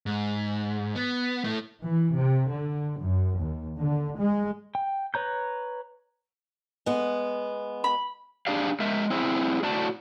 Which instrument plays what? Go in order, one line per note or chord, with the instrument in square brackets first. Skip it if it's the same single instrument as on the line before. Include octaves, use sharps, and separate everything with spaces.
[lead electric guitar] G#2
B3
A3 E4
[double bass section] E3
C3
D3
F#2
D#2
D3
G#3
[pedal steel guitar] G5
B4 C#5 A#5 G6
[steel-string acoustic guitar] G#3 B3
[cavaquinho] B5
[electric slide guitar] D4 G4 G#4 D5 F5
G#3 A#4 E5
C4 E4 G#4
A2 F#4 D5 A5